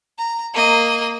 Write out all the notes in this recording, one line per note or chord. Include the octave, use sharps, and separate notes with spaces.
A#5
A#3 D#5